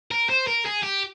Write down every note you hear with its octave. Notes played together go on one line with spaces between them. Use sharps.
A#4
C5
A#4
G#4
G4